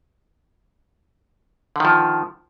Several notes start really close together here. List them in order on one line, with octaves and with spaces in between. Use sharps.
D3 D#3 F3